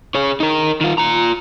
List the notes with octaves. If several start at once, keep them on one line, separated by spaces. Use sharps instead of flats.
G#4 C#5
D#4 A#4
D#3 F4
F4 A#5